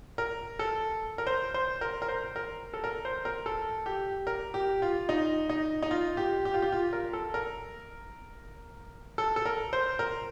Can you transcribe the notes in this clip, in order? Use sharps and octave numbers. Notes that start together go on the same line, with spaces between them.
A#4
A4
A#4
C5
C5
A#4
A#4
C5
A#4
A4
A#4
C5
A#4
A4
G4
A#4
G4
F4
D#4
D#4
D#4
F4
G4
G4
F4
G4
F4
A#4
A4
A#4
A4
A4
A#4
C5
A#4